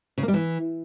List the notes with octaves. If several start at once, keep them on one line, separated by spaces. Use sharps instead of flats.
C#3
A#3
G3
E3